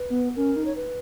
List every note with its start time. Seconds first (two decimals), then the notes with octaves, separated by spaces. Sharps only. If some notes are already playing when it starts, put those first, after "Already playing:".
Already playing: B4
0.10 B3
0.36 C#4 A#4
0.56 D#4
0.65 C#5
0.76 B4